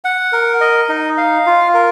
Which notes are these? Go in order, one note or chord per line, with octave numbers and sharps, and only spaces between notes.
F#5
A#4
D#5
D#4
F5
F4
A#4